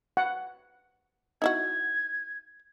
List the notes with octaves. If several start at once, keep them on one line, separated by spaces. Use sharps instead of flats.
F#5
D#4 E4 F#4 G#6